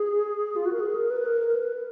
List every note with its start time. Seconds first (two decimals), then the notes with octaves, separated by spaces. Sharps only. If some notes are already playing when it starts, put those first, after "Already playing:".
Already playing: G#4
0.56 F4
0.65 F#4
0.73 A#4
0.80 G#4
0.95 A#4
1.10 B4
1.25 A#4
1.48 A#4
1.55 B4